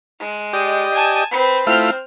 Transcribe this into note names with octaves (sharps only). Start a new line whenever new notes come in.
G#3
G4 D5 D#5
G#5 A5
C4 B4
A3 C4 E4 F4 F6